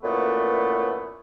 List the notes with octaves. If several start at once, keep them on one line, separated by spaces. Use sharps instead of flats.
F#2 A#2 E3 F#3 A3 B3